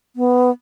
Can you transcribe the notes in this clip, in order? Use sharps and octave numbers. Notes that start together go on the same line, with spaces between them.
B3